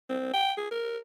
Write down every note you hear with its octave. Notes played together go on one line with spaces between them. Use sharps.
C4
G5
G#4
A#4